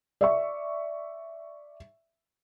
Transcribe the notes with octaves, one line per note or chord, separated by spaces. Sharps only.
D5 E5 C#6